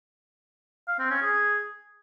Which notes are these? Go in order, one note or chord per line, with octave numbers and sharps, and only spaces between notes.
F5
C4
C#4
G#4